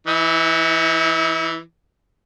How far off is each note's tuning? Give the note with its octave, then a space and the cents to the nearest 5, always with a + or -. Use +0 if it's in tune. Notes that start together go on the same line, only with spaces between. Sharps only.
E3 +0 E4 -45